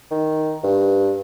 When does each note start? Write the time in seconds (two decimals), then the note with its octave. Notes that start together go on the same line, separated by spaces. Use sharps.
0.11 D#3
0.63 G2